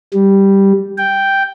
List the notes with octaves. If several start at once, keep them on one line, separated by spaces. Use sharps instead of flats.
G3
G5